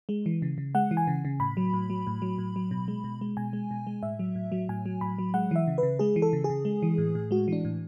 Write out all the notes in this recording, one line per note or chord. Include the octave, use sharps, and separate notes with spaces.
G#3
E3
C#3
C#3
G#3 F#5
E3
G#5
C#3
C#3
A2 B5
F#3
A2
F#3
A2
F#3
A2
F#3
B2
G#3
B2
G#3
B2 G#5
G#3
B2
G#3
A2 E5
F#3
A2
F#3
A2 G#5
F#3
A2 B5
F#3
G#3 F#5
E3 E5
C#3
C#3 B4
G#3 G#4
E3
A4
C#3
G#4
C#3
G#3
E3
A2
A2
G#3 F#4
E3 D4
A2